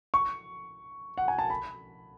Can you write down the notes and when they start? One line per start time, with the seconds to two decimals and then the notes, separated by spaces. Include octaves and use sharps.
0.14 C#6
1.18 F#5
1.28 G#5
1.39 A5
1.50 B5